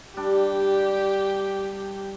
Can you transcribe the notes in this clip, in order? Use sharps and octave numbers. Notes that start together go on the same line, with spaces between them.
G3 D4 G4